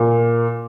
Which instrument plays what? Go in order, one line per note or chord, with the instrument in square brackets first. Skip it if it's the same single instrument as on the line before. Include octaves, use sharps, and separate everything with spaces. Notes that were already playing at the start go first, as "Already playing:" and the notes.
Already playing: [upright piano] A#2